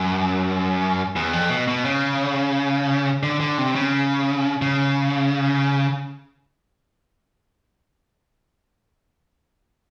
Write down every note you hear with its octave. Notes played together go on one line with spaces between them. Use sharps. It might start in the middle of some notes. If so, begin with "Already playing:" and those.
Already playing: F#2
E2
F2
B2
B2
C#3
D3
D3
C3
C#3
C#3